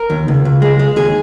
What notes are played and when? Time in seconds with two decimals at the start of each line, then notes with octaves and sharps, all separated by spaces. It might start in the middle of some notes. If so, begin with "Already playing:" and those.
Already playing: A#4
0.10 D#2
0.28 C#2
0.45 C#2
0.62 G#3
0.79 G#3
0.96 D#2 G#4